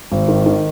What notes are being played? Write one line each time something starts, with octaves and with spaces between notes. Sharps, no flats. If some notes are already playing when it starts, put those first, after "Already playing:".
G#1
D#3
D#3